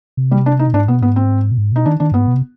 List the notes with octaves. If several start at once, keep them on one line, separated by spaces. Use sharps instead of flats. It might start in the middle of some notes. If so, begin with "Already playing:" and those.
C3
G3
D4
D#4
B2
G#2 D4
B2 B3
G#2 B3
C4
B2
G#2
B2 D#4
D#3 D4
D#3 D4
G2 B3
G#2
B2
C3